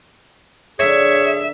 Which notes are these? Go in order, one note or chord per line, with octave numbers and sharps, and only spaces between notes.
D3 A#3 G#4 C#5 E5